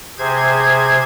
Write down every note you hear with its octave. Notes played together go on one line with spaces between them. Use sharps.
C3 G#4 C5 G#6